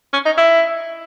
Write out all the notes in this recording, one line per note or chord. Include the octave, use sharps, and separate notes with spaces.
C#4
D#4
E4